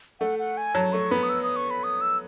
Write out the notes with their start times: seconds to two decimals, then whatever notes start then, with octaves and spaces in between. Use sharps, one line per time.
0.20 A3 F#5
0.39 F#5
0.57 G#5
0.75 F#3 A5
0.92 A3 C#6
1.11 B3 B5
1.23 D#6
1.29 E6
1.43 D#6
1.56 C#6
1.71 B5
1.84 D#6
2.01 E6